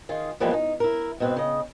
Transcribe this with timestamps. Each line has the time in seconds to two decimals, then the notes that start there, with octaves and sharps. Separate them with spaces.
0.09 D#3 F4 G#4
0.40 E3 F3 G3 G#3 A#3 B3
0.54 D#4
0.80 E4 A#4
1.20 G#2 B2 C4 B4
1.36 C#3 D#5